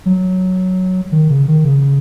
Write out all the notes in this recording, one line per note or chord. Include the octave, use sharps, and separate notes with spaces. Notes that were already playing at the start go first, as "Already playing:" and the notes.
F#3
D#3
C#3
D#3
C#3